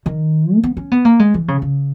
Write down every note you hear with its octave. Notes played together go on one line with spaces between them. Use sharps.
D#3
A#3
B3
C#4
B3
A#3
G#3
E3
C#3
C#3